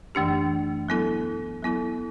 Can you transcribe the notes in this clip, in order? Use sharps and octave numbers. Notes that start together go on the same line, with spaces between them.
F#2 E3 A3 D4 G4
F#3 B3 E4 A4
F#3 B3 E4 A4